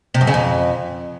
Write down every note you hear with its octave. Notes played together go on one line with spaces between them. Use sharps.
C3
F#2
C#3
F2